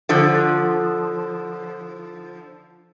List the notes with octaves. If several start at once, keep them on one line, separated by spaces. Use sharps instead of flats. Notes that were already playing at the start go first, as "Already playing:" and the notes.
D3 F3